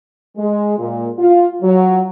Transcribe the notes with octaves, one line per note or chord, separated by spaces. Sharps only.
G#3
A#2
F4
F#3